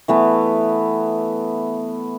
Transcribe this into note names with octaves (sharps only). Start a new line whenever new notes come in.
E3 A3 B3